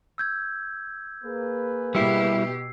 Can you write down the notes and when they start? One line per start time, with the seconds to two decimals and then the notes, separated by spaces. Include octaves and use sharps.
0.18 E6 G6 G#6
1.24 A#3 G#4 B4
1.95 B2 G3 B3 E4 G4 E6 C7